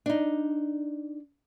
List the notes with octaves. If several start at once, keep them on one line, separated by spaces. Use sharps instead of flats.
D4 D#4